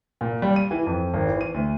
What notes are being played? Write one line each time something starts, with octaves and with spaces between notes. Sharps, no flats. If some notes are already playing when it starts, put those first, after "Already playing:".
A#2
G3
D#7
E3
F2
G#1
E3
D#7
D2